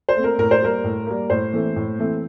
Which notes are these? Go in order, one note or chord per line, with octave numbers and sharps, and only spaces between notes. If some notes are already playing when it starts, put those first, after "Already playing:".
C5
A3 C4
A#4
A2 A#4
C5
G3 A#3 A#4
A2
G3 A#3
A2 C5
E3 A3 C4
A2
E3 A3 C4